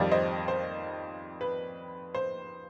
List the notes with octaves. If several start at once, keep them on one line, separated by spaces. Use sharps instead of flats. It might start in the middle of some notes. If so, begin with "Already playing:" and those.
Already playing: F2 D#3 G3 D5 F5
C5 D#5
C5
B4
C5